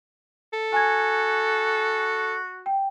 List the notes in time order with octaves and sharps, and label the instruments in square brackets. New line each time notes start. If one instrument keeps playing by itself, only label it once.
[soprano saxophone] A4
[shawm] F#4 [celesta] G#5 G#6
[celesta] G5